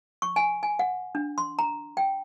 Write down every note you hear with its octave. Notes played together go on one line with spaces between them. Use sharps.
C#6
G#5
G#5
F#5
D4
C6
A#5
G5